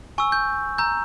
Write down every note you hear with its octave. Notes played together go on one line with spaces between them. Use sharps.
G#5 C#6 E6
G6
A#5 E6 G6